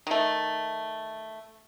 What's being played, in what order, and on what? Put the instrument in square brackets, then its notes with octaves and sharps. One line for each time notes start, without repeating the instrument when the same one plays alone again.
[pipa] D#3 A3